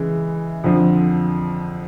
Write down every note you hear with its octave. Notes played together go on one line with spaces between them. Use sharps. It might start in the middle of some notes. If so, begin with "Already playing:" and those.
Already playing: C#3 E3 G#3
F2 D3 F3